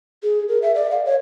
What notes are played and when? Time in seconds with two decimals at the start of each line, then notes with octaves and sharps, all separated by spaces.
0.23 G#4
0.48 A#4
0.62 E5
0.75 D5
0.91 F5
1.05 C#5